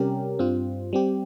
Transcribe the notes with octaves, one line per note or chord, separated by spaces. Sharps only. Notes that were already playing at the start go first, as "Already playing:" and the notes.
Already playing: C3 G3 C#4 G4 A#4
G2 G3 C4 F4
G3 C4 G4